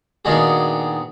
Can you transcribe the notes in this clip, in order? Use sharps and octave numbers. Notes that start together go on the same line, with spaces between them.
A#2 D#3 B3 D4 F#4 G#4